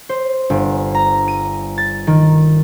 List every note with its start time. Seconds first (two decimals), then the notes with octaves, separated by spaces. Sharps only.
0.09 C5
0.50 G1
0.95 A#5
1.28 D#7
1.78 A6
2.07 D#3